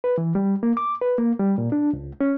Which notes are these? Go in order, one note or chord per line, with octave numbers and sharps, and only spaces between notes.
B4
E3
G3
A#3
D6
B4
A#3
G3
A#2
D4
C#2
C#4